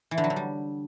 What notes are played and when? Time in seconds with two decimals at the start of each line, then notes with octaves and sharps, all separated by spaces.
0.11 E3
0.18 D3
0.24 F#3
0.30 D3
0.36 G3